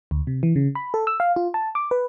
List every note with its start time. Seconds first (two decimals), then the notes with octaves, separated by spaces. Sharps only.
0.11 D2
0.27 C3
0.43 E3
0.56 C#3
0.75 B5
0.94 A4
1.07 E6
1.20 F5
1.36 F4
1.54 A5
1.75 D6
1.91 B4